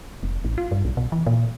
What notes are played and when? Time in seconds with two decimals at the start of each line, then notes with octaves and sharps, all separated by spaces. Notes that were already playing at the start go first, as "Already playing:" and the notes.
0.23 F1
0.44 A1
0.58 F4
0.71 G2
0.85 B1
0.97 B2
1.12 E3
1.26 A#2